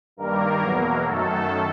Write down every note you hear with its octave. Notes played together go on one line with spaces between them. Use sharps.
G2 D#3 G3 A#3 A#4
E2 B2 F#3 A#3
F#2 D#3 F#3 A3 A4